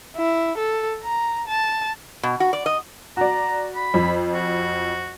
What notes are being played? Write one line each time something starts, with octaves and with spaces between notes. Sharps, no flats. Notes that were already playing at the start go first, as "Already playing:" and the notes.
E4
A4
A#5
A5
B2
F#4
D5
D#5
F#4 D5 A#5
B5
F2
F#4